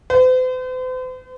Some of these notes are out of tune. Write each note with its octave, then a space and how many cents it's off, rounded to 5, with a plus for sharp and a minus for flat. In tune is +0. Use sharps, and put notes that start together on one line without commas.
C5 -45